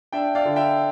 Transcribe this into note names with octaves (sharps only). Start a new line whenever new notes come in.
D4 E5 G5
D5 F5
D3
E5 G5